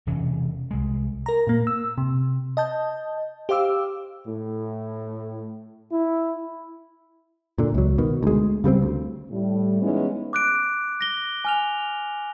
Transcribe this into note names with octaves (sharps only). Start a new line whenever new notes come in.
E1 C3 E3 C#4
C2 G#3
A#4 A#5
A#2 A#3
E6
C3
D#5 A5 G6
G4 C5 F5 D6 E6
A2
E4
A#2 D3
C#2 F#3
B2 D#3
D2 G#3
C#3 G3 A3 C4
D2
A2 G3
E3 G#3 B3 C#4 D#4 E4
D6 F#6 D7
A#6 G7
G#5 F6 F7